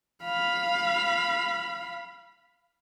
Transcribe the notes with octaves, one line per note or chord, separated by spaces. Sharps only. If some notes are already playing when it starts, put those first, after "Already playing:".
F5 B5